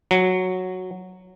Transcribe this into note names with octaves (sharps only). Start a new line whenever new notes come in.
F#3